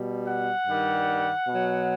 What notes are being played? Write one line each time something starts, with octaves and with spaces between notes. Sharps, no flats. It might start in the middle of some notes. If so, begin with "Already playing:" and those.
Already playing: B2 G3
F#5
G2 D#3 G3
B2 F#3